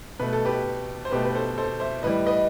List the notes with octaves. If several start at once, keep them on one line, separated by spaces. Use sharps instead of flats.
B2 A3 B4
A4
G4 B4
C5
B2 A3 G4 B4
B4
A4 C5
A4 C5
C5 E5
A2 E3 G3 B4 D#5
B4 D#5